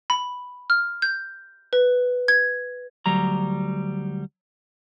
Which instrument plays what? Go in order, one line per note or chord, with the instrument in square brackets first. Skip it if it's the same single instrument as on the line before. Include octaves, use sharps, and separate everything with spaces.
[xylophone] B5
F6
G6
B4
G#6
[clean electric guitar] D2 F#3 G3 A#5